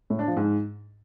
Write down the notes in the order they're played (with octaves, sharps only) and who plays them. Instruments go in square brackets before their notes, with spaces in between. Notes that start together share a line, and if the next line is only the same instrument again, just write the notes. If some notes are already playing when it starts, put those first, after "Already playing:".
[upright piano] A2
D4
F3
G#2